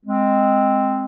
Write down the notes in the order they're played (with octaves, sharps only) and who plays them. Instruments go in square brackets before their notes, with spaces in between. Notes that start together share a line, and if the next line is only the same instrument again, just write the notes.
[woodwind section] G#3 C4